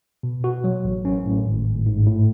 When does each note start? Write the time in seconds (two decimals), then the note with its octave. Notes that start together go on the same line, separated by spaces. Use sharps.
0.23 B2
0.44 F#4
0.64 F#3
0.85 A1
1.05 C#4
1.25 A2
1.46 G#1
1.66 G#1
1.86 G#2
2.07 A2